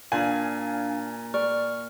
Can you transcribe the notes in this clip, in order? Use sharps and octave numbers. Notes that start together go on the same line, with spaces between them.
A#2 D4 F5 G#5
D5 C#6 F6